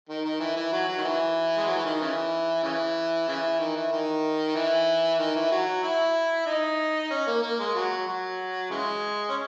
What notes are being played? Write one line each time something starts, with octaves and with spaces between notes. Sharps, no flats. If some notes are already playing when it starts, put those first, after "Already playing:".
D#3
D#3
E3
E3
F#3
F#3
D#3
E3
G#3
F#3
E3
D#3
C#3 E3
C#3 E3
C#3 E3
D#3
E3
D#3
E3
D#3
E3
F#3
E4
D#4
C#4
A#3
A#3
G#3
F#3
F#3
C#3 E3 G#3
C#4